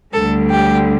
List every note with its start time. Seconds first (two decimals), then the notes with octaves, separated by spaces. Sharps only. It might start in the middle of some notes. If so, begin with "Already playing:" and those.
0.14 D2 D3 G3 A4
0.50 G4